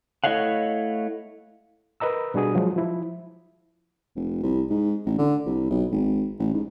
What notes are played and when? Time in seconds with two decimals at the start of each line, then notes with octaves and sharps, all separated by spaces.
0.24 A3 E4 C#5 D#5 F5 F#5
2.00 A#4 B4 D#5 A#5 E6
2.34 B2 G3 D4 F#4 G#4 D#6
2.55 F3 F#3 G#3
2.76 F3 E4
4.16 F1
4.43 C2
4.70 G#2
5.06 A1
5.18 D3
5.46 C2
5.70 B1
5.92 G#1
6.39 A1
6.53 G#2